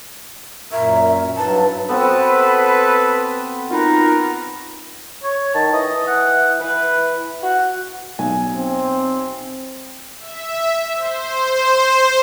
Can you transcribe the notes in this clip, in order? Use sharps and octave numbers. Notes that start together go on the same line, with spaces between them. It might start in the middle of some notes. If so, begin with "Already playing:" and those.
F#2 A#2 A#4 E5 C#6 G#6
G2 F#3 D#4 E4 B4 A5
B3 C4 F#4 A4 B4
D#4 F4 F#4 A#4 B4
C#5
D#3 A5
E3 D#5
F#5
E3 B4
F#4 F#5
B1 G#5
C4
E5
C5